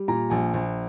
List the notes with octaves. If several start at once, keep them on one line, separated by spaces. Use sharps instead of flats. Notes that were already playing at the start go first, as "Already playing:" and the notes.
Already playing: G3
A#2 A#5
A#1 G#5
A#1